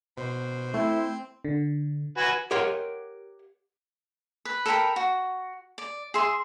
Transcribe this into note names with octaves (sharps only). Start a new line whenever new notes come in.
B2 C5
A3 C4 E4
D3
F#4 B4 G#5
G4 A#4 C#5 F#5 C6
B4
A4 A#4 G5 B5
F#4
D5
G#4 E5 C6